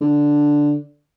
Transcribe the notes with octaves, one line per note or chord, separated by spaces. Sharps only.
D3